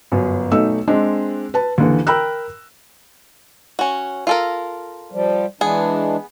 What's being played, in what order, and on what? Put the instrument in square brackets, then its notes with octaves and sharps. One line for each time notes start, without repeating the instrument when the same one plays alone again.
[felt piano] G1 F#2
B1 A3 D#4 E6
G#3 C4 D4
B4 A5
D#2 D3 E3
A#4 G5 A#5 B5 E6 F#6
[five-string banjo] C#4 F#4
F4 A4 A#4
[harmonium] F3 G3
[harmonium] E3 G#3 D4 [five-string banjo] B3 G#4